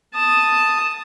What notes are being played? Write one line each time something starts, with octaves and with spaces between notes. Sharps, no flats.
A5 D#6